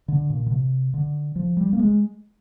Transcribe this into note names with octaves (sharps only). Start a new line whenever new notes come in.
D3
A#2
D3
C3
D3
F3
G3
A#3
G#3